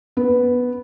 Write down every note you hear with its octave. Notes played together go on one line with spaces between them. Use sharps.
B3